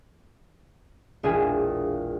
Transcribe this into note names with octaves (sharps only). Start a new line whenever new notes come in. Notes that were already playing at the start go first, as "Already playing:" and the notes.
E1 A#1 G#4 E5 G#5 D#7